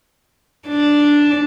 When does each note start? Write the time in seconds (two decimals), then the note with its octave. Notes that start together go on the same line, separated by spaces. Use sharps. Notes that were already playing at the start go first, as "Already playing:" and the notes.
0.68 D4